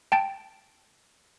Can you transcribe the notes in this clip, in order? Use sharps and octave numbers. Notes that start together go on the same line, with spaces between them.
G5 A5 A6 D7